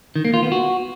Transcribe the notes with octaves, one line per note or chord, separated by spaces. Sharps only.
D#3
A#3
F4
B3
F#4